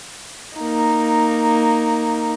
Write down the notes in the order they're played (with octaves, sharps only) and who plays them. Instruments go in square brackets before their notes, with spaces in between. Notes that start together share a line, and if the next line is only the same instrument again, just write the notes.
[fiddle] A#3 D#4